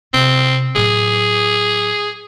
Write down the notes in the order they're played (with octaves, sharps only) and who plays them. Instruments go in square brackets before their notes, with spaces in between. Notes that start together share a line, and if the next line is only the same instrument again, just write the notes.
[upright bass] C3 [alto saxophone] C4
[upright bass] A2 F#3 [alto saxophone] G#4